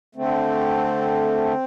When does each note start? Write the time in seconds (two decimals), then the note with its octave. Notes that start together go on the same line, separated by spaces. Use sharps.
0.15 D3 A3 C4